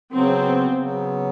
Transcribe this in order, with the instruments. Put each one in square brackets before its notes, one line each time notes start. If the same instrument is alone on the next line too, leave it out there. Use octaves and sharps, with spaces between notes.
[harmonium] C#3 F#3 B3 [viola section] C4
[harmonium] C#3 F#3 B3